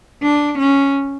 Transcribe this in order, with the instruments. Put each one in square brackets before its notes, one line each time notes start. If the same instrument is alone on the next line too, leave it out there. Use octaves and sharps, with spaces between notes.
[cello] D4
C#4